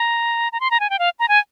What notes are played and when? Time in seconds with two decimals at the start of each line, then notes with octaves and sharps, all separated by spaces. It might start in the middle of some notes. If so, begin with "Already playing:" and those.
Already playing: A#5
0.52 A#5
0.60 C6
0.71 A#5
0.80 G#5
0.90 G5
0.99 F5
1.19 A#5
1.28 G#5